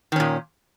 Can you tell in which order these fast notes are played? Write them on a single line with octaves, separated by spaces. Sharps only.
D#3 C#4 A#2